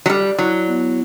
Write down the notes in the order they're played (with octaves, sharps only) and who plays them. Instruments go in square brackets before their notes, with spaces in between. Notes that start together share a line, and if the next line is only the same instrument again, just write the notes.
[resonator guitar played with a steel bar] F#3
[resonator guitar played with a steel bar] G3 [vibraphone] D5
[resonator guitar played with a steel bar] F#3 [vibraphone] E4
[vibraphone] B3